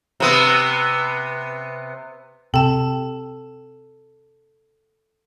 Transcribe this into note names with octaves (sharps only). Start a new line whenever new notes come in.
C3 B3
C3 A4 G5 A5